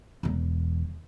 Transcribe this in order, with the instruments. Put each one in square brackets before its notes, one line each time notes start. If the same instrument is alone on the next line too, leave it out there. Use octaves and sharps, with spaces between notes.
[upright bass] E1 E2